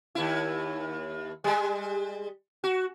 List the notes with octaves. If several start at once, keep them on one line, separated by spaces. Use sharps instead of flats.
D#2 E4
G3 G#3
F#4